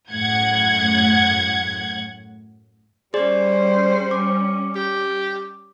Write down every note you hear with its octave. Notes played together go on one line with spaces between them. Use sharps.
F#2 A2 F#5 G#6
G3 C#4 G#4 C5 D5
D6
G4